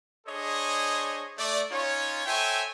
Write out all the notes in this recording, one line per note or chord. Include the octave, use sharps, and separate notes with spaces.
D4 G#4 C5 C#5 D#5
A3 D5
C#4 D#4 F4 C#5
A4 C5 C#5 E5 G5 G#5